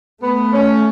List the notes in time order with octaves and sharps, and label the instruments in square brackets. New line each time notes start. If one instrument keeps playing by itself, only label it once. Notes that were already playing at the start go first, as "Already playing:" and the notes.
[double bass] A3 [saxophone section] B3
[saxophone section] C#4